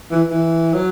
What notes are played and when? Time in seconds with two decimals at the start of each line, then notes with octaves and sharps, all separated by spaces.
0.11 E3
0.30 E3
0.74 F#3